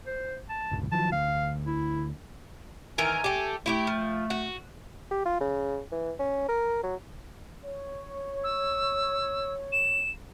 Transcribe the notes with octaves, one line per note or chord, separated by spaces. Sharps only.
C5
A5
G1 C#2
D#3 F3 F#3 A5
D2 F5
E4
D#3 E3 A#4 G#5
A3 G4
A3 E4 F4 G4
F3
F#4
G4
F4
C#3
E3
C#4
A#4
F#3
C#5
E6
E7